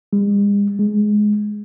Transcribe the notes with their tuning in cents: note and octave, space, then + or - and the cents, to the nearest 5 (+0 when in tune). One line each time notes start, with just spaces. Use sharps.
G#3 -45
G#3 +10